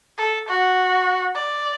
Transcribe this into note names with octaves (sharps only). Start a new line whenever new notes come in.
A4
F#4
D5